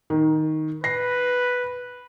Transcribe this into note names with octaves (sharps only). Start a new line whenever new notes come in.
D#3
B4 A#6 C7